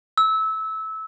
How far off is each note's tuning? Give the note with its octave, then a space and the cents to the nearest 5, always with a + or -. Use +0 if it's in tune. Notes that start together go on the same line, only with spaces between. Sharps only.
E6 -20